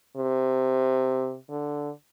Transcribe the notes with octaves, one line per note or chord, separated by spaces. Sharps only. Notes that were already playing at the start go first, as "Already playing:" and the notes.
C3
D3